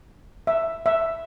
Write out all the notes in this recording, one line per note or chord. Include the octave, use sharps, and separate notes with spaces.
E5
E5